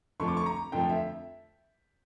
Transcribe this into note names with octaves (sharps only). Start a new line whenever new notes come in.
F2 D3 F3 A3 C#6
D6
C#6
A#5
F2 D3 F3 A3 G5
E5